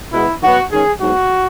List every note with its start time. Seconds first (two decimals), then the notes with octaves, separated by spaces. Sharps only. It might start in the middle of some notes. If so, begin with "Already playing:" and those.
0.12 B2 G#3 B3 E4
0.41 D#3 F#3 B3 F#4
0.71 D#3 G#3 C#4 G#4
1.00 G#2 F#3 B3 F#4